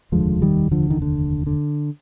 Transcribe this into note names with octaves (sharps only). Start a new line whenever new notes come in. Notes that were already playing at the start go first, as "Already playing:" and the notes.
F1 D#2 D3 F3 G#3
D#3 G3
D3 F3
D#3
D3
D3